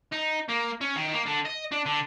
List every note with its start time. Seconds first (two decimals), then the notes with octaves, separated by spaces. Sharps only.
0.12 D#4
0.48 A#3
0.81 C#4
0.96 D#3
1.13 A#3
1.26 D3
1.45 D#5
1.72 D4
1.86 D3